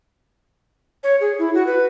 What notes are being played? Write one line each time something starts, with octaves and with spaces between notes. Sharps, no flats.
C#5
G#4
E4
F#4
B4